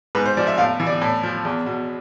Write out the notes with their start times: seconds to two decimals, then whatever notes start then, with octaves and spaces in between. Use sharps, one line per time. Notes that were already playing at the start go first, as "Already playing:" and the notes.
0.15 G#2 B4
0.26 C5
0.37 F3 D5
0.47 E5
0.58 A2 F5
0.80 E3
0.87 D5
1.01 A2
1.23 F3
1.45 E2
1.66 B2